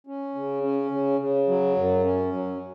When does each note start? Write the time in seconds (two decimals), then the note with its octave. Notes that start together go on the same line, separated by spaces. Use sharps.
0.07 C#4
0.35 C#3
0.63 C#4
0.91 C#3
1.19 C#3
1.48 F#3
1.75 F#2
2.04 C#4
2.32 F#3